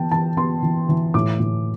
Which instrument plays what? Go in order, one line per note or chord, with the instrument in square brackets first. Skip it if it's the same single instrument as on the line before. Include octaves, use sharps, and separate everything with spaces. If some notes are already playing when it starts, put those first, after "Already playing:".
Already playing: [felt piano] E3 B3 G5 A5
E3 A5
B3 C6
E3
E3
A2 D6
A2